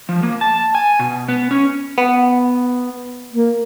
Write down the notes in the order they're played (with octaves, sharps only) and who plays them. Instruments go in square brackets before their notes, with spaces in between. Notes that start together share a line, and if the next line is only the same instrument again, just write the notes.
[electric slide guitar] F3
A#3
A5
G#5
B2
B3
C#4
[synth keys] B3
[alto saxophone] A#3